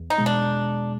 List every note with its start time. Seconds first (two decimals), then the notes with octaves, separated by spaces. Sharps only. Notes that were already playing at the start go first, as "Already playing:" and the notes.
Already playing: E2
0.10 D#4
0.18 B2 G#3
0.26 D4